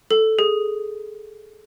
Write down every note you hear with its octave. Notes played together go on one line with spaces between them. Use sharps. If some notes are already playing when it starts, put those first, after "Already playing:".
A4
G#4